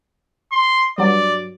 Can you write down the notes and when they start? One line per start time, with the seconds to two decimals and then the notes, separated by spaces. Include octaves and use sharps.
0.52 C6
0.98 G2 F#3 D5